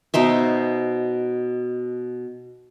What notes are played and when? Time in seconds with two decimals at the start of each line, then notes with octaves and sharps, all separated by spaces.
0.14 B2 D#4 C5 E5